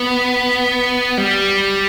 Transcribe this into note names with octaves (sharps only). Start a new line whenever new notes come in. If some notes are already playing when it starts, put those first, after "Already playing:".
Already playing: B3
G3